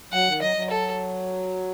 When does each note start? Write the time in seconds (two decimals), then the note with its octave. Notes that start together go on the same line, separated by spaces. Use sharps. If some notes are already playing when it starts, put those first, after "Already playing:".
0.12 F#3 F#5
0.27 D#3
0.41 F#3 D#5
0.56 F#3
0.70 A4